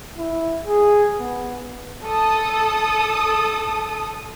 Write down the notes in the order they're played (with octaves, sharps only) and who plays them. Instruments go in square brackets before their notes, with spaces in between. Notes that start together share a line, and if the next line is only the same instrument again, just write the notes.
[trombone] E4
G#4
B3
[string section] A4 D#6